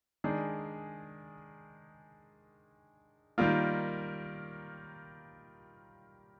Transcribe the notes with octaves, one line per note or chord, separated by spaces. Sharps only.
D#3 G#3 D4 G#4
D#3 G3 A#3 F4